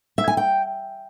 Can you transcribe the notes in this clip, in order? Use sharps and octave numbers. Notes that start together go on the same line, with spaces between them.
E5
G#5
G5